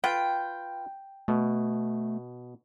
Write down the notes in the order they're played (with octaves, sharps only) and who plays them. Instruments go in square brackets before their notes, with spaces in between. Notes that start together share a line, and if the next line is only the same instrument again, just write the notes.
[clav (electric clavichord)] F4 B4 [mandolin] G5
[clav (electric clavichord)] B2 [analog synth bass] A3